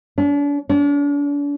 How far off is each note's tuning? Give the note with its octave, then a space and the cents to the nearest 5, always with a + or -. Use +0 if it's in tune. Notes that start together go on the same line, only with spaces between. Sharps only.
D4 -40
D4 -40